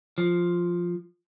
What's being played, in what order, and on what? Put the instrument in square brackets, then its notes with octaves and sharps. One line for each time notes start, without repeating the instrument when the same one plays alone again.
[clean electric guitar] F3